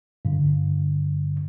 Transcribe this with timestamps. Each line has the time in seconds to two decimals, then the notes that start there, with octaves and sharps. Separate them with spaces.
0.25 G2 D3